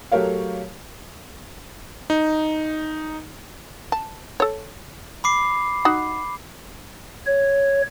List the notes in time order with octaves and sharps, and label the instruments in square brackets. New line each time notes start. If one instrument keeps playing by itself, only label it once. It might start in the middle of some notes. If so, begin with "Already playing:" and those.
[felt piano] F#3 A3 G4 A#4 C#5 F5
[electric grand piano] D#4
[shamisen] A5
A4 C#5
[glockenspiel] B5 D6 C7
[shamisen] D#4 F#4
[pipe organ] C#5